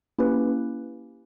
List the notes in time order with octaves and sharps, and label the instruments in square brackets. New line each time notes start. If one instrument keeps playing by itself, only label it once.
[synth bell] A#3 C#4 E4 G4 B4